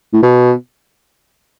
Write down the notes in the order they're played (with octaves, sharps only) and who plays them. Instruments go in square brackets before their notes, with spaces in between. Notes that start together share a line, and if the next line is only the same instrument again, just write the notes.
[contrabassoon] A2
B2